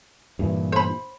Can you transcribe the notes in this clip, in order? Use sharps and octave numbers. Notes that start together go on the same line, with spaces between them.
G2 A#2 E3
C5 B5